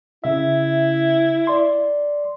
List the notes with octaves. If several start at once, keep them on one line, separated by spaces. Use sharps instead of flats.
C#3 E4 E5
D5 C6